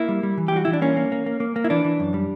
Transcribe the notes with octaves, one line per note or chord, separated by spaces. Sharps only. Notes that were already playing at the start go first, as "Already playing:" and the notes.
Already playing: A#3 E4
G3
G3
E3
G4
G3 F#4
E3 E4
D4
A#3 C#4
A#3
A#3
A#3
A#3
A#3
E4
E3 D4
E3
F#2
G3